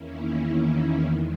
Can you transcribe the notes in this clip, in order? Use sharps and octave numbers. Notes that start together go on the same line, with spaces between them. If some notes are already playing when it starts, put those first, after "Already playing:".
Already playing: E2 D#3 A#3 C#4 E4
E2 D#3 G#3